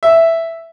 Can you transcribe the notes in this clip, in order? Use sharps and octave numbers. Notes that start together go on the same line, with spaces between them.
E5